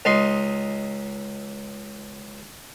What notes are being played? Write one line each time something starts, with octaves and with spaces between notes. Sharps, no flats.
C#2 D#4 C6